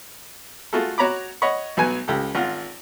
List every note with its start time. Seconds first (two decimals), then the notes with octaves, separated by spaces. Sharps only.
0.73 A3 F4 F#4 G#4 A4
0.98 F#4 C#5 A#5 B5 D6
1.42 C#5 D#5 F#5 B5 C#6
1.77 B1 F#3 B3 G#5
2.08 C#2 G4 A4
2.35 G#1 F4 F#5